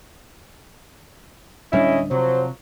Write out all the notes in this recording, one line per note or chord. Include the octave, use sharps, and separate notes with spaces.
D1 D3 G3 C#4 D4 E4 D#5
C3 F3 F#3 C5